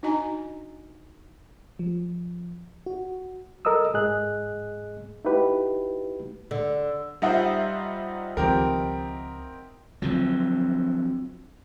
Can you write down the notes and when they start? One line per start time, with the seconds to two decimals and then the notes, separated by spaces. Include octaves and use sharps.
0.03 D4 D#4 F#4 D#5 G#5 A#5
1.79 F3
2.86 F#4
3.65 A4 A#4 D#5 D#6 E6
3.94 G#2 G#4 D#5 F#6
5.25 D#4 E4 F#4 G4 B4
6.51 D3
7.22 G3 D#4 F4 C5 E5 F#5
8.37 C#2 D#3 F3 C4 G4 A#4
10.02 D3 F3 F#3 C4